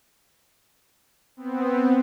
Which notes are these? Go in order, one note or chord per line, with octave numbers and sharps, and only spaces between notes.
B3 C4